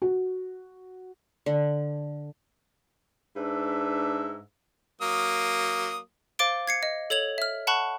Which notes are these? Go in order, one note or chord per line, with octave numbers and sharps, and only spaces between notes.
F#4
D3
G#2 D4 B4 E5
F#3 A#3 D#6
C5 F5 D6 A6 D7 G7
G#6 C7 C#7
D#5
A4 C#5 G#6 F7 F#7
E5 F6
F#5 A5 B5 C#6 F#6